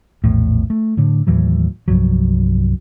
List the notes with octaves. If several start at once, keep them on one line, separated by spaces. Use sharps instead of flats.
A#1 E2 A2
A3
A2 D3
D#2 A2 E3 F#3
C2 G2 F3 F#3